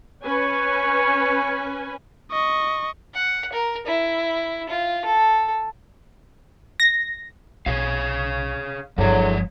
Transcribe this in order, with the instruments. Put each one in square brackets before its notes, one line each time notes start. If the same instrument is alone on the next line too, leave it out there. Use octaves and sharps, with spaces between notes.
[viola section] C#4 B4 G#5 [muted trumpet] C#5
[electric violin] D#5 C#6
[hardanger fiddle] F#5
A#4
E4
F4
A4
[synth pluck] A#6
[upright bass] B1 [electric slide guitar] G#4 C#5 F5
[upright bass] G1 G2 [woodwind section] E2 D3 F#3 [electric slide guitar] F3 C#5